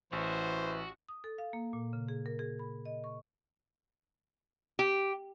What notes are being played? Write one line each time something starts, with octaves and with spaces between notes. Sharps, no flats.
A1 E3 F#4 C5
D#6
A4
F5
A#3
A#2
C#3
G#4
A#4
G#4
B5
D#5
C#6
G4